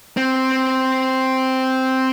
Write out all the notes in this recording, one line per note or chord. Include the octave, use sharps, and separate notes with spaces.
C4